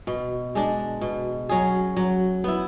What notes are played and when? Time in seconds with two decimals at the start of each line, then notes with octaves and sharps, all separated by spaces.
0.07 B2
0.55 G#3 D4
1.01 B2
1.49 F#3 C#4 G#4
1.96 F#3
2.44 B3 E4